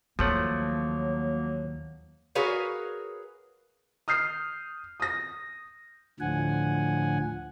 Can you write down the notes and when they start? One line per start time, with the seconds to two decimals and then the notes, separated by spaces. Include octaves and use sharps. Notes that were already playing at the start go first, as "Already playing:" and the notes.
0.19 D#2 F3 F#3 A3 A#3 F#5
2.35 F#4 G#4 A#4 B4 C#5 F5
4.08 D#6 F6 G6 C7
5.00 D#6 A#6
6.20 D2 A2 D3 F3 F#5 G#5